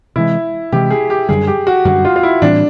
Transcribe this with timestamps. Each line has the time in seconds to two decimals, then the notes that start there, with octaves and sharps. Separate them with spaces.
0.16 C3 E3 G#3 E4
0.72 C3 E3 G#3 G4
0.90 G#4
1.10 G4
1.29 F#2 D3 G3 G#4
1.47 G4
1.67 F#4
1.85 F#2 D3 G3 F#4
2.05 F4
2.16 F4
2.23 E4
2.42 A2 E3 G3 C4 D4